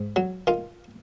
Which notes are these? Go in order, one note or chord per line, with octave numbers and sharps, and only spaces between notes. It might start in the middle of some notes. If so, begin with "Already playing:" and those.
Already playing: G#2
F#3
D#3 F4